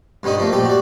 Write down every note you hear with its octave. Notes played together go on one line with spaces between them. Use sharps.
G2 D3 G3 C#4 D#4 D#6
F3 A3 A#3
A#1 G3 G4 A4
F#4 D5